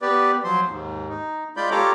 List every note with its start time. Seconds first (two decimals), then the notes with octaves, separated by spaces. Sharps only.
0.02 B3 G4 B4 D5
0.44 F3 F#3 C5 C6
0.68 D#2 G#2
1.09 D#4
1.57 G#3 F4 D5 B5 G6
1.71 F4 G4 A4 C#5 A#5 D6